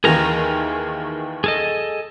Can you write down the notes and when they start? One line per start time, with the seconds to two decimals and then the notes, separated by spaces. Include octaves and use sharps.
0.04 D#2 D#3 E3 G#4 A#4 A#5
1.44 G#4 A4 D#5